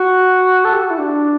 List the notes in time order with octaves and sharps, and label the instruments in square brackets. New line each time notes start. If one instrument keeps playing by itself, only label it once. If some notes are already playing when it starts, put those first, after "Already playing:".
Already playing: [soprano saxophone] F#4
A4
G4
F#4
E4
D4